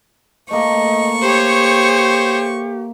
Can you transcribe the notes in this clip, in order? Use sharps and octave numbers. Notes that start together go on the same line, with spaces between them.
A3 A#3 D#5 C#6
G4 C5 C#5